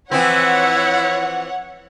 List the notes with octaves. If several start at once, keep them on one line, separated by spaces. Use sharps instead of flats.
E3 F3 C4 E4 C#5 F#5